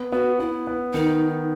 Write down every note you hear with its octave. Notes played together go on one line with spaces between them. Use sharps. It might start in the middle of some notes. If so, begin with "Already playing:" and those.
Already playing: B3
B3 F#4
B3 E4
B3
D#3 D#4